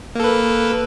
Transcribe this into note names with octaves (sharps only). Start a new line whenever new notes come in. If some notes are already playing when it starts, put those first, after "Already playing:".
A#3 A4 B4